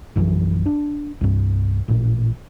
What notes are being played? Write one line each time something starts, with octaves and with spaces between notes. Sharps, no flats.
A#1 F#2 E3 F#3
D4
C2 G2
A1 A#2